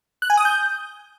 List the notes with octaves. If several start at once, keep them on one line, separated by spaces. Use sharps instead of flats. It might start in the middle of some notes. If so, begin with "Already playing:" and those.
F#6
G#5
D#6
G6